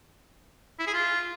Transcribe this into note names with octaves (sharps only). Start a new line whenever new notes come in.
E4
G#4
F4